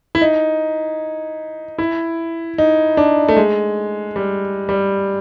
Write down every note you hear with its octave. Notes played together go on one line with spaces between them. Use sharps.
E4
D#4
E4
D#4
D4
A3
G#3
G3
G3